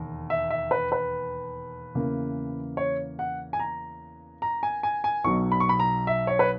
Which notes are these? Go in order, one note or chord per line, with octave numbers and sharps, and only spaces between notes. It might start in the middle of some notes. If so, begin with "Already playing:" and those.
Already playing: E1 D#2
E5
E5
B4
B4
E2 C#3 E3 A#3 C#4
C#5
F#5
G#5
A#5
A#5
G#5
G#5
G#5
B1 B2 F#3 C#6
B5
C#6
B5
A#5
E5
C#5
B4